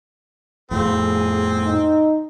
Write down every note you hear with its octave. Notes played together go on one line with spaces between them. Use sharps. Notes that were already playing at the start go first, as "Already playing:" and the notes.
F2 A2 F3 C4 G#4
D#4